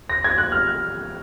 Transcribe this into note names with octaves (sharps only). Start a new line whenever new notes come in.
A#6
G#6
F#6
F6